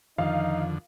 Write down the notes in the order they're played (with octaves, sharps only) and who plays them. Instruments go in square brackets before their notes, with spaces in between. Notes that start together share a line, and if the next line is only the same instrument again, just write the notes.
[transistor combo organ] F2 D3 [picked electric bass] D#3 F3 [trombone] D#4 [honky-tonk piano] F5